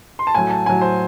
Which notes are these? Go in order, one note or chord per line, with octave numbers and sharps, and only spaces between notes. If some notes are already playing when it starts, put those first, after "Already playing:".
C6
A5
A2 F#3 G#5
A5
A2 F#3 G#5
C5